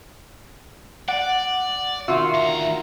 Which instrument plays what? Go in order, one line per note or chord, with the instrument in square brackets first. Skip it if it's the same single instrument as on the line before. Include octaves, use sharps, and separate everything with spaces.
[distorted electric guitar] D5 [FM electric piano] F#5
[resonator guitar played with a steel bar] D#3 F4 F#4 [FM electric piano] E5
[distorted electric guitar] D2 A#5